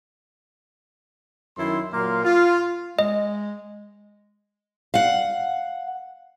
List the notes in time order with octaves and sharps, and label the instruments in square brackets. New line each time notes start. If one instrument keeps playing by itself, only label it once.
[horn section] F#2 D#3 E4 C6
A#2 F#3 A#3 F5 C6
F4
[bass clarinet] G#3 [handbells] D#5
[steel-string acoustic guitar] F5 F#5